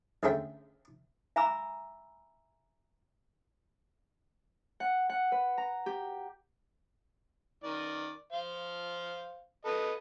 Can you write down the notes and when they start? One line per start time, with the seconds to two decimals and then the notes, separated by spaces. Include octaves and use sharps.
0.23 D2 G#3 C#4 A4 E5 G5
1.36 E5 G#5 A#5 B5 D6 E6
4.80 F#5
5.09 F#5
5.32 B4
5.58 A#5
5.86 G4
7.64 D#3 D5
8.32 C5 F5
9.65 A4 B4 D#5